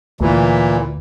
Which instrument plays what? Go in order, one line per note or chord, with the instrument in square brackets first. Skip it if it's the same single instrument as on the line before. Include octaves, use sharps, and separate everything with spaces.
[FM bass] D2 [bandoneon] A#2 E3